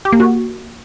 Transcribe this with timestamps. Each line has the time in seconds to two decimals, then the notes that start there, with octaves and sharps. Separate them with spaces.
0.05 G4
0.12 A#3
0.20 F#4